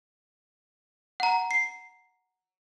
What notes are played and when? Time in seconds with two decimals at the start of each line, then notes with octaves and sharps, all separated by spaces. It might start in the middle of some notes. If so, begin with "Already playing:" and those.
1.20 F#5 A#5
1.51 C7